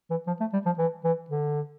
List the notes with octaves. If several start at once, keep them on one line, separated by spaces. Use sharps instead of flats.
E3
F3
A3
G3
F3
E3
E3
D3